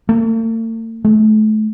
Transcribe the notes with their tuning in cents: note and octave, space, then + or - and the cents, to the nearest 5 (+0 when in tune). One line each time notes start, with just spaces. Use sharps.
A3 +45
A3 -30